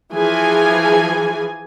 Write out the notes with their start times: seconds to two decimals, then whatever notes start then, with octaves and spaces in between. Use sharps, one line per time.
0.12 E3 F3 G#4 G#5